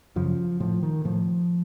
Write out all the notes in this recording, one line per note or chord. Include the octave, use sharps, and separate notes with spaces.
F#2 C#3 F3
A2 F3
D#3
A2 F3